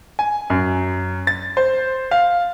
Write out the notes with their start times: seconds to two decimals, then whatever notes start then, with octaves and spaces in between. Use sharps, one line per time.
0.19 G#5
0.50 F#2
1.27 A6
1.57 C5
2.11 F5